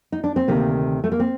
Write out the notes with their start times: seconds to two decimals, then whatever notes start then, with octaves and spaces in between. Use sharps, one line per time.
0.12 D#4
0.24 D4
0.36 C4
0.48 D2 C3 D#3 A#3
1.04 A3
1.12 A#3
1.20 C4